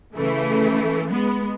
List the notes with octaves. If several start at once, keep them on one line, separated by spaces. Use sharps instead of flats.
C#3 E3 A3
G#3 B3